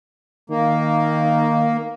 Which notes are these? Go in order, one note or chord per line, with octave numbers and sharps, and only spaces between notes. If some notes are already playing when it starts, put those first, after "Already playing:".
D#3 A#3